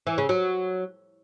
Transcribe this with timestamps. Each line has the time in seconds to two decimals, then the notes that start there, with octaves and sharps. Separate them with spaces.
0.07 E3
0.18 C#3
0.29 F#3